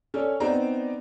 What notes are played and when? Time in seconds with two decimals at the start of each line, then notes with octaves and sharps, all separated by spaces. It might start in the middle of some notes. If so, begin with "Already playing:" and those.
0.14 C#4 A4 C#5 D5
0.40 B3 C4 D#4 C5 D5 A#5